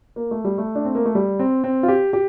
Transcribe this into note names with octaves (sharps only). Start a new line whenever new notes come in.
A#3
A3
G3
A3
D4
C4
A#3
A3
G3
C4
C4
F4
G4
G4